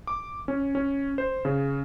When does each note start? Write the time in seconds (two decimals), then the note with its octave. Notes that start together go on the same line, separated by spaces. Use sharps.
0.07 D6
0.48 C#4
0.75 C#4
1.18 C5
1.45 C#3